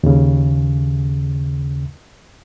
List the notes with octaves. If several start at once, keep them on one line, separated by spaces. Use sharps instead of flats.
D#2 C#3